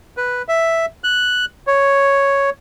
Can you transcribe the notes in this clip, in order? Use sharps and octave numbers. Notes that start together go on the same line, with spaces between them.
B4
E5
F#6
C#5